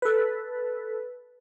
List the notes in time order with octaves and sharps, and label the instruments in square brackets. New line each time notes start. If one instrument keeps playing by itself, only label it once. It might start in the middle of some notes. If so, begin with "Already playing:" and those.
[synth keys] A4 B4